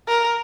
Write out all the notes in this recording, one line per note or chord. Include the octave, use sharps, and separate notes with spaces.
A#4